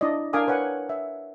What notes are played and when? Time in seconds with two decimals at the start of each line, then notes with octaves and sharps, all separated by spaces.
0.01 D4 E4 D5 D#5
0.33 D4 A#4 F5 G#5 D6 D#6
0.48 B4 C#5 F#5 G#5
0.89 E5